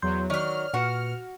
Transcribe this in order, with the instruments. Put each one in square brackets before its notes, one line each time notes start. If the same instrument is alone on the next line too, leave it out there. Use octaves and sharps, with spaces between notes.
[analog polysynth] E2 F#3 [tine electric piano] C6 G6
[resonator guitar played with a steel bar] D#3 F#3 [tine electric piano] C#5 D5 [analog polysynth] F6
[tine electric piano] A#2 B4 C#7 [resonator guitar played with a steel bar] F#4 F#5